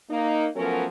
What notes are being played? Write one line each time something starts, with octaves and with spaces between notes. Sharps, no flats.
A#3 D#4
F3 F#3 A3 B3 C#4 A#4